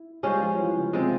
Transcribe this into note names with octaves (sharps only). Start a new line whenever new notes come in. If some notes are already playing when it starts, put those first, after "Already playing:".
Already playing: E4
G3 G#3 C#4 F4 C5
F3
E3
C#3
C3 G#3 C4 F4